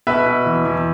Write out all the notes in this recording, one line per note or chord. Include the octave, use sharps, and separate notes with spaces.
B2 B4 E5
B2
E2
E2